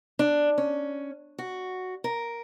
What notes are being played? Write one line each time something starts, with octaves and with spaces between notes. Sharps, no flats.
D4
C#4
F#4
A#4